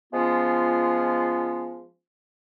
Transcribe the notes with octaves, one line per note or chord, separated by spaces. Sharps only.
F3 G#3 B3 C#4 F4